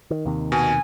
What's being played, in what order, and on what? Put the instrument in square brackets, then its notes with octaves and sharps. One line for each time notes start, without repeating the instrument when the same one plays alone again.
[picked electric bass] D#3
D#2 C3 D#3
[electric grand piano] B2 [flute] G#5